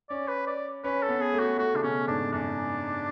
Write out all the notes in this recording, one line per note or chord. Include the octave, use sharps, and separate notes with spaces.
C#4 D5
B4
D5
C#4 B4
A4
B3
G#4
A3
F#4
A3 F#4
C#3 D4
B2 C#4
G#2 D4
F#2 D4